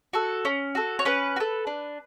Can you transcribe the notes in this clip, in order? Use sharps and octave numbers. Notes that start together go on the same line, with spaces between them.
F#4 A4
C#4
F#4 A4
C#5
C#4 B4
F#4
A4
D4